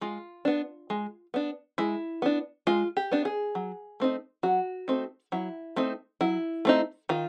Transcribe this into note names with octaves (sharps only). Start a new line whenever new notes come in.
G#3 F4
B3 D4
G#3
B3 D4
G#3 E4
B3 D4
G#3 F4
G4
B3 D4
G#4
F#3
A3 C4 D#4
F#3 F#4
A3 C4 D#4
F#3 E4
A3 C4 D#4
F#3 E4
A3 C4 D#4
D#3 F4